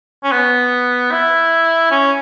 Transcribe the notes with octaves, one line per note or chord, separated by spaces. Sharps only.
C#4
B3
E4
C#4